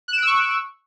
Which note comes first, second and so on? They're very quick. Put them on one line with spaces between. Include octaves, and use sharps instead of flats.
F#6 E7 D7 E6 C#6